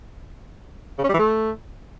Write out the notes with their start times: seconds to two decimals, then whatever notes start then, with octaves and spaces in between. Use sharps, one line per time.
0.98 C#3
1.04 C#4
1.09 G3
1.14 E3
1.19 A3